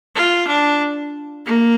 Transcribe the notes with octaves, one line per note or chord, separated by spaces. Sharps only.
F4
D4
A#3